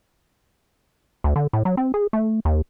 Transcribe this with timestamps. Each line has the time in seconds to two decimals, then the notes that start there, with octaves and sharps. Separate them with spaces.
1.24 D2
1.36 D3
1.53 A2
1.65 F#3
1.77 C4
1.94 G#4
2.13 A3
2.45 D#2